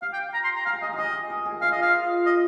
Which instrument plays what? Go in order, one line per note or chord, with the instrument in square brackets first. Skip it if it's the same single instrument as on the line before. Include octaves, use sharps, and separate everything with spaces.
[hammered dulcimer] G4 [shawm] F5
[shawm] G5
A#5
C6
A#5
[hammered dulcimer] G#4 [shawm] F5
[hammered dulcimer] G#4 [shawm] D#5
[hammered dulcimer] G4 G#4 [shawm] D#5
[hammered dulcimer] A#4
G#4
[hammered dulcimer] F4 [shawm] F5
[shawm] D#5
F5
D#5